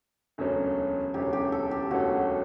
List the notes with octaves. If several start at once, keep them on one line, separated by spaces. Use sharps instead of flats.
E1 D2 C#3 F#3 C#4
E1 D2 C#3 F#3 C#4 G4
G4
A4
G4
E1 D2 C#3 F#3 C#4 F#4